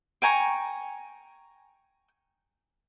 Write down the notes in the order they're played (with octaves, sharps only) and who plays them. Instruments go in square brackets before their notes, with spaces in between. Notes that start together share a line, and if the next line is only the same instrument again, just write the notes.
[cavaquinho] G5 G#5 A#5 C#6